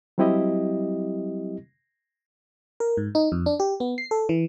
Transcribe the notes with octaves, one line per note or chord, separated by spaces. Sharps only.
F#3 G3 C4 E4 G4 D#5
A#4
G#2
D#4
F2
D4
G4
B3
C7
A4
E3